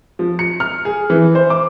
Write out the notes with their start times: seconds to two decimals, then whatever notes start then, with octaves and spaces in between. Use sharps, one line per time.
0.19 F3
0.39 C#7
0.60 F6
0.85 G#4
1.10 E3
1.35 C5
1.50 D6